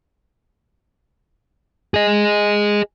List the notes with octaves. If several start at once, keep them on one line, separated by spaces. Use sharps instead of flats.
G#4 D#5